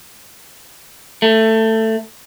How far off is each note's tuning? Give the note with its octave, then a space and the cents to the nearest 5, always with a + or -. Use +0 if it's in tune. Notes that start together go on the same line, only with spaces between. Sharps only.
A3 +15